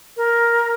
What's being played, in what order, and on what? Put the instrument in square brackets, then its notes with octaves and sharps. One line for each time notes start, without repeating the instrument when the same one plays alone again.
[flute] A#4